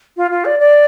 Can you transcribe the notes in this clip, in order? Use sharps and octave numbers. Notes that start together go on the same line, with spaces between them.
F4
F4
D5
D5